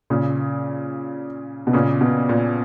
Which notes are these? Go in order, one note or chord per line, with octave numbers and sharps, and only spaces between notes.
A#2 C#3
B2
A#2 C#3
B2
A#2